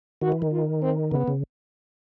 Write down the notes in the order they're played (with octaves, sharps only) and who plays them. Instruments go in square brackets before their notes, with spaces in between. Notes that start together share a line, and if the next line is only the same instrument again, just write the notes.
[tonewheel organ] D#3 [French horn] F#4
[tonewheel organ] E3
D#3
[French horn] F4
C4
[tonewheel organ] C#3 [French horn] B3
[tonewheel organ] C#3